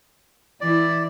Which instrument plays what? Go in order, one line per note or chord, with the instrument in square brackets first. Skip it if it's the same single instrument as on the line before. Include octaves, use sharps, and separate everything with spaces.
[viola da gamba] E3 E4 [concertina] D5